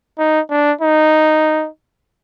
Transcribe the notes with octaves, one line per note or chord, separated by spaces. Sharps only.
D#4
D4
D#4